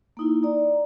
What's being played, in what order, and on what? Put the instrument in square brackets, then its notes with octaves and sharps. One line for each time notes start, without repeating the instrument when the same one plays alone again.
[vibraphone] A#3 D#4 E4
D5 A#5